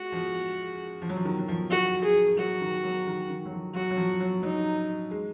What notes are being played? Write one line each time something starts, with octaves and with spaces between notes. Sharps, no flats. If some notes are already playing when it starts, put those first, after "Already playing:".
Already playing: G#3 F#4
F3
F3
F#3
F3
D#3
F#3
F3
F#4
G#4
F#3 F#4
D#3
F#3
D#3
D#3
F#3
F3
F#3 F#4
F#3
F3
F#3
F#3 D#4
G#3